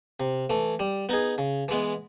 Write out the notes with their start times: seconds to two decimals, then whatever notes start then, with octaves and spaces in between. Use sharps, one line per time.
0.20 C3
0.50 E3 A3
0.79 G3
1.09 B3 D#4 G#4
1.38 C#3
1.68 E3 G#3 B3